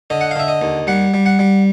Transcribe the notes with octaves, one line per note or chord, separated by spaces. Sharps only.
D3 D#5
F#5
F5
D3 E5
D#5
D#2
G3 F#5
G3
F#5
G3